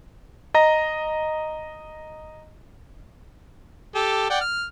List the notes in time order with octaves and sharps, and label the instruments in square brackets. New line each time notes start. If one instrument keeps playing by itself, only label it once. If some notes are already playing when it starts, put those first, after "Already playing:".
[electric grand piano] D#5 A#5 A#6
[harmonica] G4 A4
D5 F#5 G5
F6